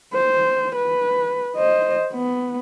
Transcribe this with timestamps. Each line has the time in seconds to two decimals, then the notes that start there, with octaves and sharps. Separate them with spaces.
0.14 C5
0.75 B4
1.56 C5 D#5
2.13 B3